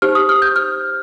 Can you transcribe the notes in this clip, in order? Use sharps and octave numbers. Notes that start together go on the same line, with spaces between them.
D#4 G4 C5 F6
D#6
F6
G6
F6